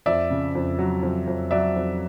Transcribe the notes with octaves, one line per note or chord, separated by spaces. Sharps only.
F2 D5 E5
C#3
F2
F#3
F2
F2
F#3 D5 E5
F2